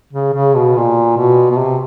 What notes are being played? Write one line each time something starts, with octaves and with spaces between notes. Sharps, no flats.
C#3
C#3
B2
A#2
B2
B2
C3